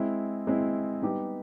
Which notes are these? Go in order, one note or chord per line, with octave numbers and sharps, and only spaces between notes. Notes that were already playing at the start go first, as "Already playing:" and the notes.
Already playing: G#3 C4 E4
G#3 C4 E4
G3 B3 D#4 G4